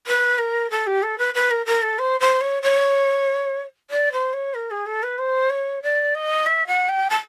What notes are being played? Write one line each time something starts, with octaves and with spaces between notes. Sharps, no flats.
B4
A#4
A4
G4
A4
B4
B4
A#4
A#4
A4
C5
C5
C#5
C#5
D5
C5
C#5
A#4
G#4
A4
B4
C5
C#5
D5
D#5
E5
F#5
G5
A5